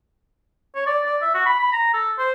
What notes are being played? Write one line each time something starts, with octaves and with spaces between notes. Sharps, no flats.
C#5
D5
D5
E5
F#4
B5
B5
A#5
A4
C5